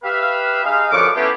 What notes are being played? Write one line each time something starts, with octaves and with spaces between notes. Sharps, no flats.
G4 B4 E5 F5
G#3 D#4 F5
F#2 D3 F3 B4 C#6 D6
A3 B3 C#4 E4 F4 G4